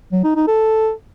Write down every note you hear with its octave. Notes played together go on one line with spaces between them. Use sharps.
F#3
D#4
D#4
A4